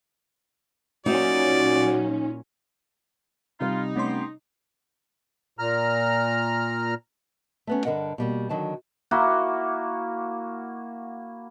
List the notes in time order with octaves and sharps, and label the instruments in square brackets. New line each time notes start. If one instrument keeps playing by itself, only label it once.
[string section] A#2 F#3 C#4 [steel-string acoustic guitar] D#4 E5 [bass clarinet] F#4 [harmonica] D5
[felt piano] C3 G3 [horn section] D#4 [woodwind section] F4
[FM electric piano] A3 C#4 C6 [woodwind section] B3 G4
[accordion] A#2 A#5 F6
[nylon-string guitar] A3 B3 C#4
G2 D3 A#4 D#5 F#5
B2 G3 A#3
D3 D#3 F#3 D#4 A5
[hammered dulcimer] A#3 E4 F#4